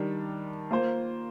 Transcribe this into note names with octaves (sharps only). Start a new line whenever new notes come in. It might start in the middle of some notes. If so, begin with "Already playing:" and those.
Already playing: D#3 G3 D4
A#3 F4 C5